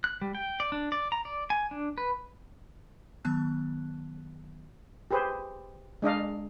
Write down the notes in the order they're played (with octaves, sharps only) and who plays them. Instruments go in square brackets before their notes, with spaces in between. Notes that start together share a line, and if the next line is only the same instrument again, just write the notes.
[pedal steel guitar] F#6
G3
G5
D5
D4
D5
A#5
D5
G#5
D4
B4
[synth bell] D#3 F#3 B3 A5 F#6
[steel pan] G4 G#4 B4 C5
G#3 D4 D#5 F5